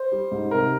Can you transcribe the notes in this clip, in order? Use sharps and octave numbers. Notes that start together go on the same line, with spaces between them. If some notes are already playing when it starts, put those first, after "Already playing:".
Already playing: C5
G3
G#2
C3 A#4